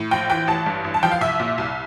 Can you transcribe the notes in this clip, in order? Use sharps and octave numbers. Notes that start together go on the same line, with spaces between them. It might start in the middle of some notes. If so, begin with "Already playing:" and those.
Already playing: A2
A#1 G5
E3 G5
A1 A5
G2
A1
A5
F3 G5
F5
C2 E5
A#2
C2